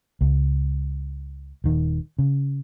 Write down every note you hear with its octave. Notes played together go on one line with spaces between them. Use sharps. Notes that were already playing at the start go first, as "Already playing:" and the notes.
C#2
D#1 D#3
C#3